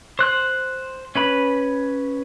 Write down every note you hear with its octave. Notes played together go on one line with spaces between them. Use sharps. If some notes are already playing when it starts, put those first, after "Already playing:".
C5 F#6
C#4 B4 B5